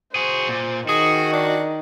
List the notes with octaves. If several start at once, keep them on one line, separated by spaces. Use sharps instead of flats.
F#4 G#4 C5
A#2
D#3 F#4 G#4
D4